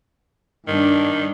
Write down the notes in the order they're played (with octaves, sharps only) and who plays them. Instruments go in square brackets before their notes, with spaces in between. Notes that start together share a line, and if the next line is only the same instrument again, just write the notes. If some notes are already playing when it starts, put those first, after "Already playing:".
[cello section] G2 D4 [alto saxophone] D#3